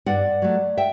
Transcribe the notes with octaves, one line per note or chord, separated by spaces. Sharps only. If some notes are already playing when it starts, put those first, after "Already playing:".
G2 D5 F#5
F#3 A3
E5 G5